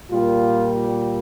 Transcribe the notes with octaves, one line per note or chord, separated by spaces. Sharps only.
A#2 G3 A#3 F4